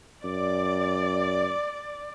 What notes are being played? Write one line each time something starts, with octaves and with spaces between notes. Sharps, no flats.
F#2 D5